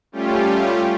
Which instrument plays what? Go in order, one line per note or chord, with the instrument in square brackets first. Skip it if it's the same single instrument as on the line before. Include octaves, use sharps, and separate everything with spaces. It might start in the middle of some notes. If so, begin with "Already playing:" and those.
[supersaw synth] G3 A3 C#4 F4 G4